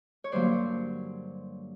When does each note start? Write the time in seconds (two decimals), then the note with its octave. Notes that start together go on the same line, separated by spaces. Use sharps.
0.24 C#5
0.32 G2 D3 F#3 A#3 C5 D5